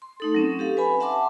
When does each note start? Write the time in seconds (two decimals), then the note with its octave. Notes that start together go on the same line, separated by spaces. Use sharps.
0.02 C6
0.20 A3 D#4 A4
0.34 F#3 C4 C#4
0.59 G4 A4 F5
0.77 B4 G#5 B5
1.00 E5 F#5 A5 C6 D6